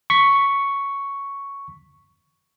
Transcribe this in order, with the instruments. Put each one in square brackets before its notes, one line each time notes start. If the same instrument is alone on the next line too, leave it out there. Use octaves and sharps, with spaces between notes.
[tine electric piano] C#6 B6